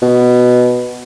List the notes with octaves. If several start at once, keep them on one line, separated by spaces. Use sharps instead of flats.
B2